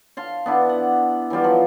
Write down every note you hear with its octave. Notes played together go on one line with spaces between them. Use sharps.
F5 A5 C6
B3 D4 E4
F#5
E3 F#3 G3 F4
F3